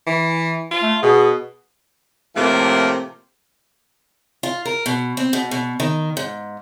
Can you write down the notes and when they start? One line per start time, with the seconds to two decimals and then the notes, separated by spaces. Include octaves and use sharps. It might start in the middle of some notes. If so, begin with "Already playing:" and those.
0.07 E3
0.71 F4
0.82 A3
1.03 B2 G#4
2.36 A2 C3 F3 A3 A#3
4.43 F4
4.65 A#4
4.86 B2
5.17 C4
5.33 B2
5.51 B2
5.80 D#3
6.17 G#2